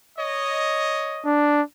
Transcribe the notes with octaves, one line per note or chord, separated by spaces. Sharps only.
C#5 D#5
D4